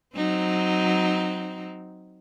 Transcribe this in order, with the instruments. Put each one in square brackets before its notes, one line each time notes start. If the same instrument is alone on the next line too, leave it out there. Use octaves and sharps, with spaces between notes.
[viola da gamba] F#3 C4 D#4